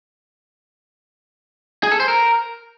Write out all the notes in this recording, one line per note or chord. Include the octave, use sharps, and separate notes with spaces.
G#4
A4
C5
A#4